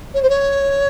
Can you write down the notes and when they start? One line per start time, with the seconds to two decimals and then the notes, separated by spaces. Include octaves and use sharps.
0.14 C#5
0.22 C5
0.29 C#5